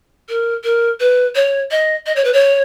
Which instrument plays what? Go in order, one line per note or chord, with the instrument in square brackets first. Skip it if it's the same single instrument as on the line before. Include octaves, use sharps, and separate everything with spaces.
[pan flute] A#4
A#4
B4
C#5
D#5
D#5
C#5
B4
C#5